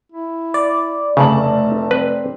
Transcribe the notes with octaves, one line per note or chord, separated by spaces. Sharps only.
E4
D5
F1 C#3 A3 A5 F#7
C4 B4